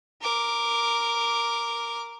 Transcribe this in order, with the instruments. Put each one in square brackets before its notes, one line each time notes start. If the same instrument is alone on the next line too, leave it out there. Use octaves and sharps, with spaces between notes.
[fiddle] A#4 D6